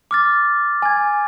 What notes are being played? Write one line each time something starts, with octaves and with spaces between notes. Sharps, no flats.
D6 F6 A6
G#5 G#6